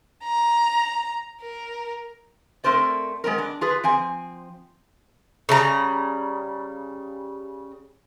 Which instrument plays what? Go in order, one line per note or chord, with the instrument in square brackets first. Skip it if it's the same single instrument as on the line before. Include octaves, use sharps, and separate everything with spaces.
[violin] A#5
A#4
[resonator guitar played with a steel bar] A3 C4 A#4 C5 D5
G#3 B3 C4 A#4
D4
F4 G#4 B4
F3 C4 G#5
[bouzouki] C#3 G3 A#5